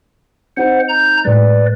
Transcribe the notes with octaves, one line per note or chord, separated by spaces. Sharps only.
C4 D#4 C5 F#5
A#5 G6
A2 G#3 B4 D5